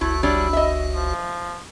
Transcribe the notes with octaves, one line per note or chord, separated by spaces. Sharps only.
F#1 C#2 A3 E4 F#4
G3 D4 E4 C#5
D#5 E5
F3